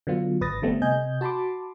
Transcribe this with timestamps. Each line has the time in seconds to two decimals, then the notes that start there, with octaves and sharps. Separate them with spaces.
0.07 D3 F#3 B3 F4
0.41 G#1 B4 D#6 A6 A#6
0.62 D3 G3 A3 B3 C4
0.82 C3 D#5 G#5 G6
1.21 F#4 A5 B5 C6 D6